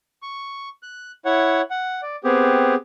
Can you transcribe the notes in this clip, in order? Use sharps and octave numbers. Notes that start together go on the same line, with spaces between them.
C#6
F#6
E4 C#5 F#5
F#5
D5
B3 C4 G4 G#4